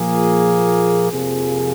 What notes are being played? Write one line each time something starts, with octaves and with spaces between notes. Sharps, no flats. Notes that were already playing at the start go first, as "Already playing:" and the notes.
Already playing: A#2 F3 A#3 G#4
F2 C3 F3 A#3 G#4